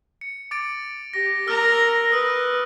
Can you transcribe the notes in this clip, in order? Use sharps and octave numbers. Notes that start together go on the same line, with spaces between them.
C#7
D6 A6 D7
G4 A#6
A#4 A#5 E6 F6
B4 D#6 E6 A#6